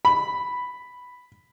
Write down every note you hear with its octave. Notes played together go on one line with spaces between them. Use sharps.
B5